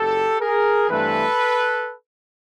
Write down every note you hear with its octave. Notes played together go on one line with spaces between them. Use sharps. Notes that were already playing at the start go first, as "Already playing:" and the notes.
Already playing: F#1 G4 A4
G#4 A#4
G2 E3 A3 C4 A4 B4